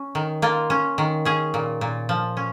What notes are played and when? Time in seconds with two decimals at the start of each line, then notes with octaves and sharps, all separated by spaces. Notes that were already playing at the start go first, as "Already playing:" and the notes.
Already playing: C#4
0.15 D#3
0.42 A#3 F4
0.70 C#4
0.98 D#3
1.25 C#4 G#4
1.54 A#2
1.81 A#2
2.09 F3
2.37 C#4